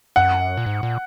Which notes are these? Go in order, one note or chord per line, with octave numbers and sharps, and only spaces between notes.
F#2 F#5
A#2
G#2
A#2